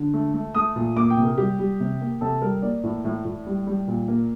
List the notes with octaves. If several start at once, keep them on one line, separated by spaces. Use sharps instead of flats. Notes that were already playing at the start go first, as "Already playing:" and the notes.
Already playing: D3
A3
A3
A3 D#6
A#2
A#3 D6
G5
C3
A#4
G3 G4
G3
C3
A#3
C3 A4
G3 A#4
A#3 D5
A2
A2
A2
G3
G3
A#2
A#3